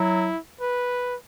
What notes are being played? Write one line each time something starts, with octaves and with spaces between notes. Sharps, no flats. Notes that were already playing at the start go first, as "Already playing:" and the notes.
Already playing: F#3 E4
B4